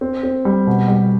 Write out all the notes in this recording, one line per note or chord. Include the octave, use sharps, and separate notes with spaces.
C4
C4
G3
B2
G3